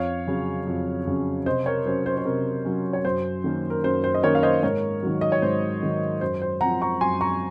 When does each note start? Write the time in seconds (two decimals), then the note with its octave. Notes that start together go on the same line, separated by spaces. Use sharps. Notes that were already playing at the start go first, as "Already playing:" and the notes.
Already playing: F2 C#5 F5
0.27 C#3 F#3 C#4
0.67 F2
1.07 C#3 F#3 C#4
1.46 C3 C5 D#5
1.66 A#4 C#5
1.86 F#3 C#4 C5
2.06 C5
2.17 C5
2.25 C3 A#4
2.65 F#3 C#4
2.93 C#5
3.05 F#2 C5
3.44 D#3 A#3 C#4
3.70 A#4
3.84 F#2 C5
4.04 C5
4.14 D#5
4.23 D#3 A#3 C#4 A#4 C#5
4.35 F5
4.43 C5 D#5
4.63 G#2 A#4 C#5
5.03 D#3 F#3
5.21 D#5
5.32 C#5
5.42 G#2 C5
5.83 D#3 F#3
6.21 F#2 C5
6.42 C5
6.61 F3 C4 F#5 A#5
6.82 A#5 C#6
7.01 F#2 G#5 C6
7.21 A#5 C#6